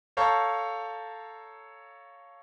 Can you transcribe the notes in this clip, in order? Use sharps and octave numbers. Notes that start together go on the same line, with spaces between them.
A4 C#5 F5 A5 A#5 G6